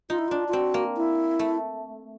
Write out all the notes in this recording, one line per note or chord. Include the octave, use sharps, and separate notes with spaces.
D#4 F4
E4
D4 F4
F4
C4 F#4
A#3
E4
A3